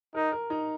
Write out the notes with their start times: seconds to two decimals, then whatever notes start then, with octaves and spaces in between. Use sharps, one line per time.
0.15 D#4 A#4
0.32 A#4
0.50 D#4